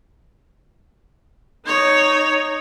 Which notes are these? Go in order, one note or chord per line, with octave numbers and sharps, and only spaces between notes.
D#4 C#5